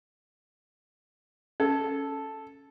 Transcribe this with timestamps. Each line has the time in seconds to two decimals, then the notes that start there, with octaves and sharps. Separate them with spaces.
1.60 C#4 A4